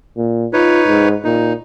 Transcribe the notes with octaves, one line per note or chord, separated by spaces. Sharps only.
A#2
D#4 F4 B4 C#5
G#2
A#2 D#4